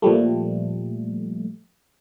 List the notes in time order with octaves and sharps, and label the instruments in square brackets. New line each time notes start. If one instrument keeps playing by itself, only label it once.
[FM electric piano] A#2 F3 G3 A3